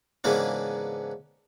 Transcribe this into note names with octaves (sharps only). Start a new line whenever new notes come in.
G#2 C#3 E3 A#3 B3 D4